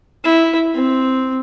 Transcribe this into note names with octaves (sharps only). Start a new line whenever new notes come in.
E4
C4